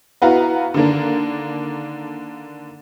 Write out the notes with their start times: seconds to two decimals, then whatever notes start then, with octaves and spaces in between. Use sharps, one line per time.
0.22 B3 E4 F#4 B4 F5 A#5
0.74 D3 D#3 A#3 D4